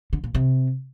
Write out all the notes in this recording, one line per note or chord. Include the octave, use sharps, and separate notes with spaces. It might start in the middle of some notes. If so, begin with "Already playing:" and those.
D3
A#2
C3